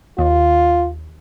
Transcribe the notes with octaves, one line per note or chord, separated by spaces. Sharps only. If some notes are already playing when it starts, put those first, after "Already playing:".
D#2 F4